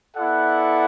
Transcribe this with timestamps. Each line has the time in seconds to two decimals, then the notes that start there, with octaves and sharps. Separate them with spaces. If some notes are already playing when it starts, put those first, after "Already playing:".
0.15 B3 E4 A4 D5 F#5